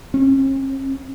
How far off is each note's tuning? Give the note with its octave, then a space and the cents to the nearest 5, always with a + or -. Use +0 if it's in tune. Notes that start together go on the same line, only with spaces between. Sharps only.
C#4 -45